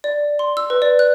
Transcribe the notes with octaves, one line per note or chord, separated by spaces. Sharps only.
D5
C6
E6
B4
D5
F#6